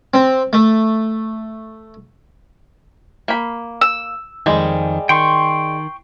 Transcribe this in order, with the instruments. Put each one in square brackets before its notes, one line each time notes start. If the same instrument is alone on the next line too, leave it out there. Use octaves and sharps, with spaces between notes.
[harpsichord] C4
A3
[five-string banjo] A#3 B5
[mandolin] E6
[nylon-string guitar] F2 D#3 [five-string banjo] G3 G#3
[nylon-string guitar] D#3 [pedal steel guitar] G5 C6 C#6